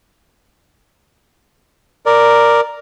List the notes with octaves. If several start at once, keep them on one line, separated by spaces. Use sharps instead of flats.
A#4 D5